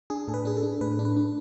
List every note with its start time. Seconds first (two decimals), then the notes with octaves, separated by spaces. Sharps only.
0.10 D4 G#4
0.28 A2 A4
0.34 B4
0.45 D4 G#4
0.57 A4
0.63 D4
0.81 A2 B4
0.99 D4
1.05 B4
1.17 D4